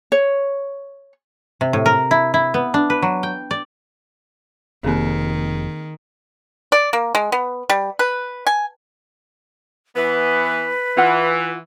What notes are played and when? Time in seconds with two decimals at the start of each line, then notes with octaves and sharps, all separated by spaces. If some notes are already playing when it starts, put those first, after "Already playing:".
0.12 C#5
1.61 C3
1.73 A2
1.86 A#4
2.11 E4
2.34 E4
2.54 B3
2.74 D4
2.90 B4
3.02 F#3
3.23 G5
3.51 D5
4.84 F1 D#3 A#3 C4 G#4
6.72 D5
6.93 A#3
7.15 G#3
7.32 B3
7.70 G3
7.99 B4
8.47 G#5
9.96 E3 B3 B4
10.97 E3 F4 F#5